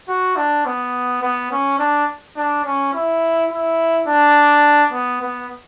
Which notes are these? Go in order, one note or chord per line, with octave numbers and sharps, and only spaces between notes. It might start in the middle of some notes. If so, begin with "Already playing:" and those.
F#4
D4
B3
B3
C#4
D4
D4
C#4
E4
E4
D4
B3
B3